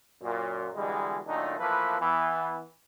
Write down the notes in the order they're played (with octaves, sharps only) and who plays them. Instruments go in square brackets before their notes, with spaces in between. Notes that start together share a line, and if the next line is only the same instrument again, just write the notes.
[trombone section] F#2 A#2
B2 D3 E3 G3 G#3
F#2 A#2 D#3 A3 D4 D#4
E3 F3 A3 A#3 B4
E3 B3